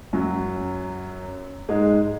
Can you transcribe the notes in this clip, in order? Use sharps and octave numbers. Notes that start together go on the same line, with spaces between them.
F#2 F#3
G#2 G#3